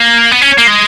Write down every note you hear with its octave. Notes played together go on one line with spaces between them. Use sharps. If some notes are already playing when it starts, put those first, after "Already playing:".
Already playing: A#3
B3
C#4
A#3
G#3